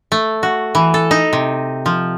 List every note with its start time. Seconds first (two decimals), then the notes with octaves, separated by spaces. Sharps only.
0.12 A3
0.43 F#4
0.75 E3
0.94 A4
1.11 D#4
1.33 C3
1.86 F3